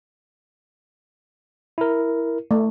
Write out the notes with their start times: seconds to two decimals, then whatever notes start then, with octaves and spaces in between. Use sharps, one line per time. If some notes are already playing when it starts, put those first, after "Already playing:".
1.78 E4 A#4
2.51 A3